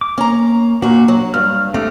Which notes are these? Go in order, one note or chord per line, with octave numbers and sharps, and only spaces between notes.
D6
A#3 C#4 A#5
A#2 A#3 D4 F#4
F#3
G2 F6
A3 C4 G4 A4